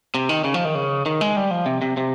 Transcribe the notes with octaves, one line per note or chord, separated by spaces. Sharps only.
C3
D#3
C#3
F3
D#3
C#3
D#3
G#3
G3
F3
C3
C3
C3